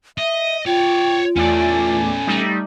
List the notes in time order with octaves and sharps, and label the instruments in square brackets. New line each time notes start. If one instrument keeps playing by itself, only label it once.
[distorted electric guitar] D#5 [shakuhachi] E5
[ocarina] F4 [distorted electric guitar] C#5 D5 [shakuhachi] G5
[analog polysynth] E2 A3 D5 [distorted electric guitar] C#4 A4 [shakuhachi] G#5
[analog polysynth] G3 A3 D#4